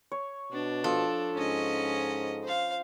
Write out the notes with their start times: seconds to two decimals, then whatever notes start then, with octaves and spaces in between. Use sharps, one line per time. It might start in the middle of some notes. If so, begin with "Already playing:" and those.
0.12 C#5
0.52 B2 D4
0.84 F3 A4
1.35 G#2 C#4 D#5
2.43 C5 F5